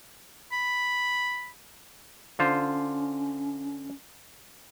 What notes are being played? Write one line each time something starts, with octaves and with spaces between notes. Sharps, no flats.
B5
D3 C#4 F4 C5